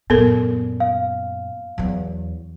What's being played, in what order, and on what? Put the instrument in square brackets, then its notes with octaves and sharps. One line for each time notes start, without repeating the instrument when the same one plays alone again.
[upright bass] F#2 A#2 [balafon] B3 A4 A#4
[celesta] F5
[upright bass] E2 F#3